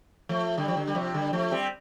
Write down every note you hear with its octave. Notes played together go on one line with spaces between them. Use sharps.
F3 A3
D3 G3
F3
D3
G3
C3 F3
D3 G3
F3 A3
G3 C4